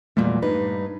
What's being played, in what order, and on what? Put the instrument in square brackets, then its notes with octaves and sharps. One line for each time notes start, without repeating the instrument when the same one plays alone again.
[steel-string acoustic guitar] E2 A#2 F#3 [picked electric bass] G3 A3
[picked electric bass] G2 [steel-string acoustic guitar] D#4 B4